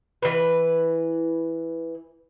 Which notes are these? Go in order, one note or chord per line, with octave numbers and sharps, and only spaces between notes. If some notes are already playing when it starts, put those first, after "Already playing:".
E3 B4